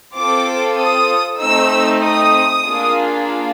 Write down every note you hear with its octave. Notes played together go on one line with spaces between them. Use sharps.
C4 F4 A4 D6
D#6
A3 C4 D#4 E6
D#6
A#3 D4 F4 G#4